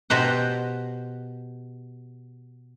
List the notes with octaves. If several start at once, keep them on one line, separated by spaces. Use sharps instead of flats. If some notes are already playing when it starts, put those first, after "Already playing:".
B2 G4 C5 F#5